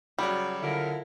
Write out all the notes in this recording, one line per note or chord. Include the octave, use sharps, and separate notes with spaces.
C#3 F#3 G3 F#4 C#5 D5
D3 E4 F4 A#4